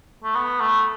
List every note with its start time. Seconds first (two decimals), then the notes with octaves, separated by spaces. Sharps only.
0.24 A3
0.35 B3
0.60 A3